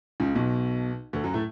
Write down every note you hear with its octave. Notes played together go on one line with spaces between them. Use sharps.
C#2 C#3
B1 B2
D2 D3
F#2 F#3
A2 A3